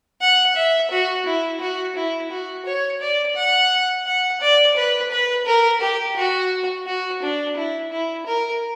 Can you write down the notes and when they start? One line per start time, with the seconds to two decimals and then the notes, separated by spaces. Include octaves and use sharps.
0.21 F#5
0.55 E5
0.91 F#4
1.25 E4
1.60 F#4
1.95 E4
2.31 F#4
2.66 C#5
3.00 D5
3.36 F#5
4.06 F#5
4.41 D5
4.76 B4
5.11 B4
5.46 A#4
5.81 G4
6.16 F#4
6.86 F#4
7.22 D4
7.56 E4
7.91 E4
8.26 A#4